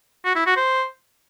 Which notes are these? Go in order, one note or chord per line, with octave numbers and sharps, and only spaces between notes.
F#4
E4
F#4
C5